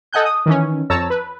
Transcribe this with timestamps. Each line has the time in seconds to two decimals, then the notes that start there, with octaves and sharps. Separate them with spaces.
0.13 A4 D#5 F#5 G#5 F#6 G6
0.25 D#6
0.46 D#3 E3 C#4
0.90 F2 C#5 A5 A#5 E6
1.10 B4